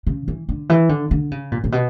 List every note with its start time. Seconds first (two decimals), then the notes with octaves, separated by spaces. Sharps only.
0.07 C#3
0.28 E3
0.49 D3
0.69 E3
0.89 D3
1.11 D3
1.31 C#3
1.52 A#2
1.64 A#2
1.72 B2